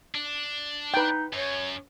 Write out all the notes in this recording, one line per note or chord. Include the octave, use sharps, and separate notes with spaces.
D4
D#4 B4 G5
F#2 C#5